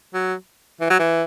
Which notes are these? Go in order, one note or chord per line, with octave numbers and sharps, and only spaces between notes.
F#3
E3
F#3
E3